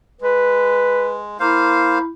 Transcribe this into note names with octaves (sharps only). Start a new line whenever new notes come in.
G#3 B4
A#3 E4 C5 F5